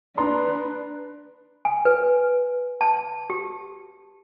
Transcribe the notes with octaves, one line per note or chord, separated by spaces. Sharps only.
D4 B4 D5 A#5 C6
G#5
B4
A5
G4